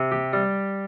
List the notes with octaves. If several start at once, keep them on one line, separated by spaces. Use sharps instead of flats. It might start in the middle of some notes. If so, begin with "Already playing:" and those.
Already playing: C3
G4
G3